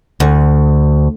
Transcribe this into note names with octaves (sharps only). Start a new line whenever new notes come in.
D2